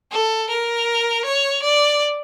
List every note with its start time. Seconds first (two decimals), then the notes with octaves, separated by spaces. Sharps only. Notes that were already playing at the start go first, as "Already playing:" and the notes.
0.12 A4
0.49 A#4
1.25 C#5
1.62 D5